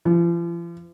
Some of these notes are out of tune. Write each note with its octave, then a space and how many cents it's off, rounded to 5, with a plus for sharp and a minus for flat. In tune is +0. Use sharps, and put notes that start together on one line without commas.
F3 -45